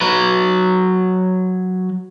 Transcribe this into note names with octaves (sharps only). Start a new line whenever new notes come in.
F#3 B4